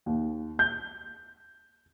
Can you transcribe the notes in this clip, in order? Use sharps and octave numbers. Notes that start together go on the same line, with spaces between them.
D#2
G6